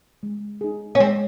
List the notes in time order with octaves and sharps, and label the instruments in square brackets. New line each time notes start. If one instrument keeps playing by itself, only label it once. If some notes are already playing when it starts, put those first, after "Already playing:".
[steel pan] G#3
D#4 G#4
[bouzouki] C#4
[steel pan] G#3 [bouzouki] C4